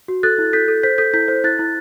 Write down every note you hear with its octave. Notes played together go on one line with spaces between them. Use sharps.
F#4
A4 F#6 A6
E4
A4 G6 B6
A4
C5 G6 B6
A4 G6 B6
E4 G6 B6
C5
E4 F#6 A6
E4